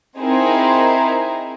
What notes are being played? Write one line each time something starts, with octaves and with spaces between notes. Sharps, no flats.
C4 D#4 E4 G#4 A#4 C5